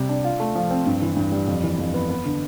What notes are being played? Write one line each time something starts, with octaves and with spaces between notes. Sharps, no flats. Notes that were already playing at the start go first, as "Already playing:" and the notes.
Already playing: C3 G3
D4
F4
A3
F3
C4
G2
E3
G2
G3
F2
E3
F2
B3
B3
D3